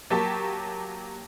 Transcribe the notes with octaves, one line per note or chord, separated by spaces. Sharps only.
F#3 A#3 G4 A5 C#6